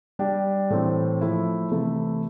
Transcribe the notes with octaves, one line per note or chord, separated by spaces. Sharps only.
G3 D4 G4
A2 E3 A3 C4
F3 A3 E4
C3 E3 A3 E4 A4